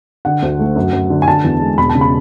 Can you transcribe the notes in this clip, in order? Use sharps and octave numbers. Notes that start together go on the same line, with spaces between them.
D3 F#5
D2
A3
F#2
F#2
D3
G#5
D3 A5
E2
G#3
E1 B5
A5
C#3
B5